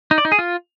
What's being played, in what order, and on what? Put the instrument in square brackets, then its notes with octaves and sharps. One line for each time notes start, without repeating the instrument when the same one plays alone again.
[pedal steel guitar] D#4
D5
D#4
G#4
F4